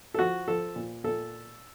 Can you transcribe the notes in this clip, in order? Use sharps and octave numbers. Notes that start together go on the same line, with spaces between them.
A4
F3 F#4
F3 A4
A#2
A#2 A4